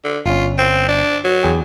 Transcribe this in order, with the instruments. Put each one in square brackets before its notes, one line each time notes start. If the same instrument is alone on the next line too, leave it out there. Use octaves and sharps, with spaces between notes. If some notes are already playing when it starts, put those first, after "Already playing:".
[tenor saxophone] D3
[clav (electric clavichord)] G1 C#4 [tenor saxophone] F4
[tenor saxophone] C4
D4
F#3
[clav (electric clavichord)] E2 G#4 G5